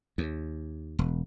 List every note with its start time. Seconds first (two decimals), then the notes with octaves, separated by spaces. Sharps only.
0.18 D#2
0.99 E1